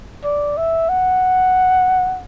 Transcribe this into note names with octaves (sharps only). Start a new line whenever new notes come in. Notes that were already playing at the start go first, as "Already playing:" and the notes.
D5
E5
F#5